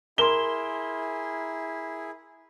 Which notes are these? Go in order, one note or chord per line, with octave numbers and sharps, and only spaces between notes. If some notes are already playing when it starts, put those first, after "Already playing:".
E4 G#4 A#4 C6 E7 G7